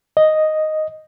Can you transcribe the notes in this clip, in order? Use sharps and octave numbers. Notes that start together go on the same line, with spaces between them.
D#5